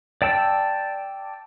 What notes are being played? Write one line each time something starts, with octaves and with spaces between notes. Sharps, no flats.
D5 G5 A5 E6